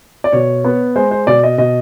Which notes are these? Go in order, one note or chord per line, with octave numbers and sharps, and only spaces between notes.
D5
B2 C#5
B3
G#3 C5
C5
B2 D5
D#5
B2 D#5